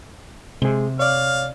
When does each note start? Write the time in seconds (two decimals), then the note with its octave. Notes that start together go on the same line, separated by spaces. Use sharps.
0.62 C3 G#3 G#4
0.99 C#5 D5 F5